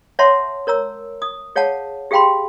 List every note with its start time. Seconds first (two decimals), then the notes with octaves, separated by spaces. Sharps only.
0.19 C#5 E5 F#5 A5 C6
0.67 A#4 C#5 A#5 E6
1.22 D#6
1.56 G#4 C#5 F5 F#5 A5
2.11 G4 G#4 F5 G5 B5 C6